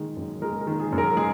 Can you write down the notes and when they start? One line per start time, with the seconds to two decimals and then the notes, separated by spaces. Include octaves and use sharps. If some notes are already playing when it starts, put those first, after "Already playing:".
Already playing: D#3 G#3
0.17 F#2
0.42 G#3 A#4
0.61 A#4
0.67 D#3
0.79 G#4
0.92 F#2
0.98 A#4
1.17 G#3 G#4